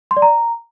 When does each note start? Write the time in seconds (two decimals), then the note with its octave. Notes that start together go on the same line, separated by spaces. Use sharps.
0.11 C6
0.17 D5
0.22 A#5